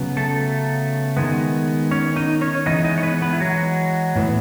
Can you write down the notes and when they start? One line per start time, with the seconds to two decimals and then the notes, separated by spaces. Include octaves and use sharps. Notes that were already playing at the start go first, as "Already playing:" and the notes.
Already playing: C#3 F#3 B3
0.17 A3 A4
1.17 D#3 G#3 B3
1.91 C#4 C#5
2.16 D#4 D#5
2.41 C#4 C#5
2.66 E3 G#3 B3 D#4 D#5
2.84 D#4 D#5
2.98 C#5
3.03 B3 B4
3.22 B3 B4
3.33 E4
3.40 F#3 F#4
4.16 A2 E3 B3